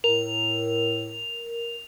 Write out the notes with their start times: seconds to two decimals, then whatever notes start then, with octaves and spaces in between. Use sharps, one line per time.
0.04 A2 A#4 F7